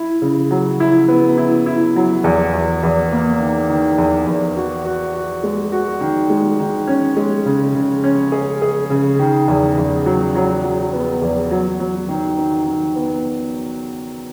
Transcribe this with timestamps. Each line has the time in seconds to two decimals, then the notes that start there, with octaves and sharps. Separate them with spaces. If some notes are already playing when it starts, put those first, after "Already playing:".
Already playing: E4
0.22 C#3
0.51 F#3
0.80 E4
1.08 B3
1.38 E4
1.66 E4
1.96 F#3
2.24 E2
2.53 E2
2.83 E2
3.12 A#3
3.40 D#3
3.70 D#3
3.98 E2
4.27 E2
4.56 F#4
4.85 F#4
5.14 F#4
5.44 G#3
5.72 F#4
6.01 D#3
6.30 G#3
6.60 D#3
6.87 C#4
7.17 G#3
7.46 C#3
7.75 C#3
8.04 C#4
8.32 G#4
8.62 G#4
8.90 C#3
9.19 D#3
9.48 E2
9.78 E2
10.06 F#3
10.35 F#3
10.64 F#3
10.93 B3
11.22 E2
11.51 F#3
11.80 F#3
12.08 D#3
12.38 D#3
12.67 D#3
12.96 B3